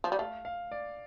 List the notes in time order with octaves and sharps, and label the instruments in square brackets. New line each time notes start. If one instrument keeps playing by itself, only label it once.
[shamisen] F3
G3
[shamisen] A3 [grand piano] F5
[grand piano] F5
D5